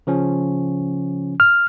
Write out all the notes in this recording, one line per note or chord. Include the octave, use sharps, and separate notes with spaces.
C#3 F3 C#4
F6